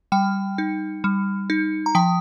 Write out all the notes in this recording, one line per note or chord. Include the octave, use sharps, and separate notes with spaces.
G3 G5
D#4
G3
D#4
A#5
F3 G5